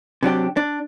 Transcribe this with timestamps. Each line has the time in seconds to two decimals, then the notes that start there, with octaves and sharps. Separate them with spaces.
0.23 C3 F#3 D4 G4
0.57 D4